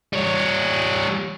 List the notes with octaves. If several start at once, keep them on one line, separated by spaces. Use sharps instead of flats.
G3 C#5